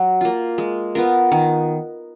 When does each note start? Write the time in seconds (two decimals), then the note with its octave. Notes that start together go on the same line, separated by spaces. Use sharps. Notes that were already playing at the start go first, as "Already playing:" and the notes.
Already playing: F#3 F#4
0.21 A#3 F4
0.58 G#3
0.95 B3 F4 A#4
1.32 D#3